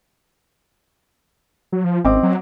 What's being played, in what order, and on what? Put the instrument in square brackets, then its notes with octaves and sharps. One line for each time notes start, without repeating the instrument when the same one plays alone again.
[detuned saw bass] F#3
F3
[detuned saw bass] G#1 [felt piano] C4 D#5 D6
[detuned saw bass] F#3